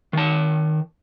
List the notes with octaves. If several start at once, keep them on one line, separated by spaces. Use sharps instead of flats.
D#3 A5